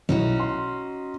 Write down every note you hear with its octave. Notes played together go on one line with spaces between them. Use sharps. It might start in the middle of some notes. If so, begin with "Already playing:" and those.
B1 C#4 D#4 E4 F#4
C6